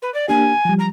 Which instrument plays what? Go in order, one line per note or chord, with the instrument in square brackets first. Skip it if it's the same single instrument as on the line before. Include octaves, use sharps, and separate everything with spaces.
[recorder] B4
D5
[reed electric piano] A#3 D4 G4 [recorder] G#5
[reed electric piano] F3 G3
[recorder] A#5